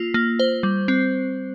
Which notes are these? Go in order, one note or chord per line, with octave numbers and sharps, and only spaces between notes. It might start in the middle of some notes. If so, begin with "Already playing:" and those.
Already playing: A#3 F4
A#3
C5
G3
C4